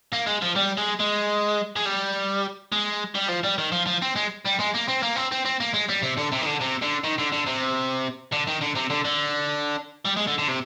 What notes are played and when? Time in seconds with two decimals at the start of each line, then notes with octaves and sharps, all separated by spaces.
0.13 A#3
0.27 G#3
0.42 F3
0.56 G3
0.78 G#3
0.99 G#3
1.76 G#3
1.86 G3
2.72 G#3
3.15 G3
3.29 F3
3.44 G3
3.58 D#3
3.72 F3
3.87 F3
4.02 C4
4.16 G#3
4.45 G3
4.59 G#3
4.74 A#3
4.88 C4
5.02 A#3
5.16 C4
5.32 C4
5.45 C4
5.60 A#3
5.74 G#3
5.89 G3
6.03 C3
6.18 D3
6.32 C3
6.42 D#3
6.46 D3
6.61 C3
6.82 D3
7.04 D#3
7.18 D3
7.32 D3
7.46 C3
8.32 D3
8.48 D#3
8.62 D3
8.76 C3
8.90 D3
9.05 D3
10.06 G3
10.17 G#3
10.27 D3
10.39 D3
10.48 C3